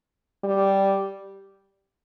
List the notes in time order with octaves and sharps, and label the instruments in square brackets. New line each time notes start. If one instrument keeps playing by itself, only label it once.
[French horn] G3